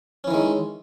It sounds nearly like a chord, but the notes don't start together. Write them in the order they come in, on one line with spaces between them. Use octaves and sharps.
C#4 E3 D#3 G#3